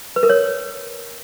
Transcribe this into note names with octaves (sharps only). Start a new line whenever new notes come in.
B4
A#4
C#5